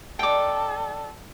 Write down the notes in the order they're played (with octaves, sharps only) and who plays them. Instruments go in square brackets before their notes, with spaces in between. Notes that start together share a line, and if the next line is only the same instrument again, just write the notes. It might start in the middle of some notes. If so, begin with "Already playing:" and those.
[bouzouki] D4 D#4 [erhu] A4 [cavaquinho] G5 D6